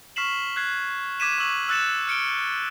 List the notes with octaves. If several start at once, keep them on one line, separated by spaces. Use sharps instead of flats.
C#6 F6 B6 C7 E7 F#7
F#6 G#6 C7
D6 G#6 B6 D#7 E7
C#6 E6 F#7
E6 F#6 A6 C#7 E7
F6 C#7 D7 G7